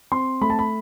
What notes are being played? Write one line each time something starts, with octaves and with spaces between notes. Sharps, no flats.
C4 C6
A3 B5
A5
B5